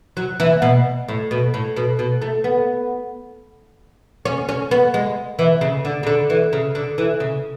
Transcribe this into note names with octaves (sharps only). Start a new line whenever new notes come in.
F#3
E3
B2
A2
B2
A2
B2
B2
A3
B3
C#4
C#4
B3
G#3
E3
C#3
D3
C#3
D3
E3
C#3
D3
E3
C#3